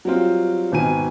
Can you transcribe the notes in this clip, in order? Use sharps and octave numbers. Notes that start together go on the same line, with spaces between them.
F#3 G3 C4 F4
G#1 B2 G#5 D#7